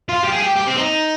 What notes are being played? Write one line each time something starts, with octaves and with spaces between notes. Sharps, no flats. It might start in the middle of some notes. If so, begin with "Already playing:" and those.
F4
G4
G#4
G4
G4
C4
D#4